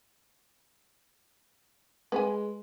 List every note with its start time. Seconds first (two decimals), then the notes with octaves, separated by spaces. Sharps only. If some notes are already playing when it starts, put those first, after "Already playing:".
2.12 G#3 B4 G#5